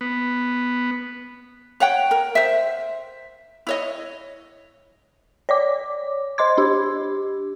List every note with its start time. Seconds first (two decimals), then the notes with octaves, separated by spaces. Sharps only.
0.01 B3
1.80 C#5 F#5 G5
2.11 A#4
2.35 C5 E5
3.67 E4 C#5 D#5
5.49 C#5 D5 D6
6.38 C5 D#5 C6 D6 G#6
6.58 D4 G4